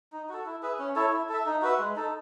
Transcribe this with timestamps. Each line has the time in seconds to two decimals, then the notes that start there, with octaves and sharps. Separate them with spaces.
0.12 D#4
0.29 F#4 A4
0.46 E4
0.62 G#4 B4 E5
0.79 C#4
0.96 E4 A4 C#5
1.13 E4
1.29 A4 E5
1.46 D#4
1.62 F#4 B4 E5
1.79 G#3
1.96 D#4 A4